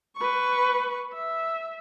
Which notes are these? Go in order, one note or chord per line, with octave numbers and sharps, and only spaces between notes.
B4 C#6
E5